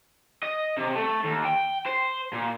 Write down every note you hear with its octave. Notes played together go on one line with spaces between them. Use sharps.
D#5
C3
A3
D#2
G5
C5
A#2